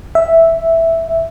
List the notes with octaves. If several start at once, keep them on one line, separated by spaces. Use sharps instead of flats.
E5